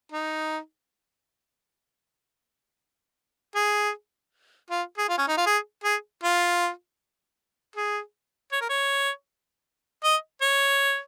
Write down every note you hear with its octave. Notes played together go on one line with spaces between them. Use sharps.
D#4
G#4
F4
G#4
F4
C#4
D#4
F4
G#4
G#4
F4
G#4
C#5
A#4
C#5
D#5
C#5